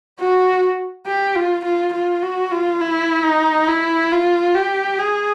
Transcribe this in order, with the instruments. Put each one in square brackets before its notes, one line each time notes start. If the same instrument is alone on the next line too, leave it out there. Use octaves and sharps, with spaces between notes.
[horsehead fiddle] F#4
G4
F4
F4
F4
F#4
F4
E4
D#4
E4
F4
G4
G#4